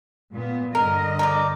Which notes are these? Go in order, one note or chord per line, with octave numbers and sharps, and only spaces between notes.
A#2 B3
G2 D3 A#4 D#5
A#4 C5 D5